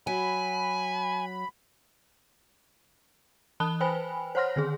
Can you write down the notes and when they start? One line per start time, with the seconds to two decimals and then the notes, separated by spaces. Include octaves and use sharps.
0.07 F#3 G#5 B5
3.60 E3 A5 B5 D#6 F#6 G7
3.80 B4 C5 G5 G#5 B5
4.35 C5 C#5 F#5 C6 F6 A#6
4.56 D3 D#3 G#4